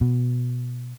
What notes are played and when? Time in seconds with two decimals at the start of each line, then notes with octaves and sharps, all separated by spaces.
0.01 B2